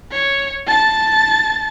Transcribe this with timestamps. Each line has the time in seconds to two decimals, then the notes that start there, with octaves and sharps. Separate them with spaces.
0.11 C#5
0.66 A5 A6